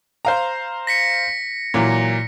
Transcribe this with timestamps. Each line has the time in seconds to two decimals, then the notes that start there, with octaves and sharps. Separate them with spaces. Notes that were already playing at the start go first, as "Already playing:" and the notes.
0.25 C5 F5 A#5
0.87 A#6 B6 C#7
1.74 A#2 E3 F#3